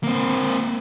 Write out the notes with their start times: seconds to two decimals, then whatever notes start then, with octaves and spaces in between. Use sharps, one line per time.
0.03 A#3 C4